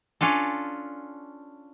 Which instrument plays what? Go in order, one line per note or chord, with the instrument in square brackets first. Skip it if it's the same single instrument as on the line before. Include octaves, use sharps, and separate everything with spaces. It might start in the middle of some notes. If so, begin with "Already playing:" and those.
[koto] C#4 D4 F4 A4